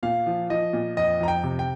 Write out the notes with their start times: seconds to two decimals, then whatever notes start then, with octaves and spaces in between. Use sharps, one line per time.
0.03 A#2 F5
0.26 F3
0.50 F3 D#5
0.73 A#2
0.97 F2 D#5
1.20 F2 A#5
1.28 G5
1.44 C3
1.59 G5